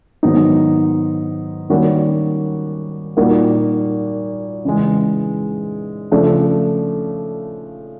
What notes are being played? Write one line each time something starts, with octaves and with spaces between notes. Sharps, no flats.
G#2 D#3 F#3 B3 D#4
D#3 G3 A#3 C#4 F#4
A#2 G3 A#3 D#4 F#4
C#3 E3 G#3
C#3 F3 A3 D4